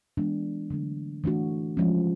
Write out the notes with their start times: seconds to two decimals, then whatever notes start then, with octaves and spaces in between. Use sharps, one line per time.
0.17 E3 G#3 B3 D4
0.70 D3 F#3 A3 D4
1.24 E3 A3 D4 F#4
1.77 F3 G#3 C#4